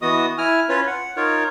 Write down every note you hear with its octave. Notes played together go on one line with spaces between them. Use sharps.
E3 B3 F#4 D#5 D#6
E4 G#5 F6
C#4 F4 B4 C#5
F#5
D#4 F4 A#4 C#5